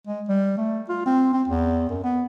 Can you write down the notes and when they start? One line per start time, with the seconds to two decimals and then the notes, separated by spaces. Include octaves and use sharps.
0.07 G#3
0.29 G3
0.57 A3
0.89 F4
1.06 C4
1.33 C4
1.48 E2
1.89 F#2
2.04 B3